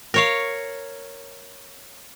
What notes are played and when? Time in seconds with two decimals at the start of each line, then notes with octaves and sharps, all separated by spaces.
0.14 A#4 C#5 F5